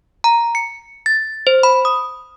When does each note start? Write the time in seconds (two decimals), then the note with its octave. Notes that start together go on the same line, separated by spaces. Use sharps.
0.24 A#5
0.55 C#7
1.06 A6
1.47 C5
1.63 B5
1.85 D#6